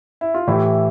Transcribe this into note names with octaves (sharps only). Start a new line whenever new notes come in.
E4
F4
A2 E3 E4 G4